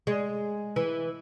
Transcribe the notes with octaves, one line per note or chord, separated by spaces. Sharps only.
G#3
E3